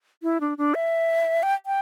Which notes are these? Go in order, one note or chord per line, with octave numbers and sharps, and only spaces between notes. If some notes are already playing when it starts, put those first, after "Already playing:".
E4
D4
D4
E5
G5
G5